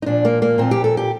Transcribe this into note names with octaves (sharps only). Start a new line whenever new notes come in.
D#4
A#2 F3 D4
A#3
A#3
A#2 F3 C4
G4
A4
G4